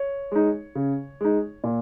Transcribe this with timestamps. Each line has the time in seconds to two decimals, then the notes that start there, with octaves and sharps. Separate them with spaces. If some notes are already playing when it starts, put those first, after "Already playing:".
Already playing: C#5
0.32 G#3 D#4
0.75 C#3
1.21 G#3 D#4
1.64 A#2